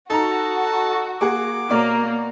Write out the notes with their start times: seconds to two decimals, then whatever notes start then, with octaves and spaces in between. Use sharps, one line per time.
0.10 D#4 F#4 A4 A#5
1.21 A#3 G#4 F#5 D6
1.70 B2 A#3 C#5 D5